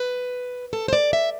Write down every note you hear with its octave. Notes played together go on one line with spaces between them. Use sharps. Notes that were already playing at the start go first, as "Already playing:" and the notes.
Already playing: B4
A4
C5
D5
E5